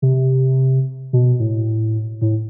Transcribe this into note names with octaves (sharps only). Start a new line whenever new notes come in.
C3
B2
A2
A2